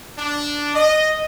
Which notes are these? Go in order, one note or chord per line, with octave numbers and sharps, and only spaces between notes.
D4
D#5